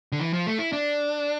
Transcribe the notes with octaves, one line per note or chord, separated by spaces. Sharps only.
D3
E3
F3
A3
E4
D4